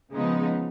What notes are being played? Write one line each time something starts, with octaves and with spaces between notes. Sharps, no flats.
C#3 F3 G#3 B3 D#4